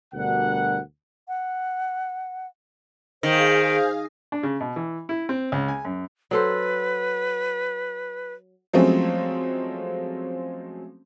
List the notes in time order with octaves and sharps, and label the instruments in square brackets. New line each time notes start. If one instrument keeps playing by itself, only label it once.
[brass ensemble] D2 B2 G3 D4 A#4 F#5
[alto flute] F#5
[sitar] D#3 [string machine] G#4 F5 [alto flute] C5
[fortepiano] D4
C#3
B2
E3
E4
C4
C#2
G#5
F#2
[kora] F#3 A4 C5 [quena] B4
[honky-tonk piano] F3 F#3 G#3 A3 C4 C#4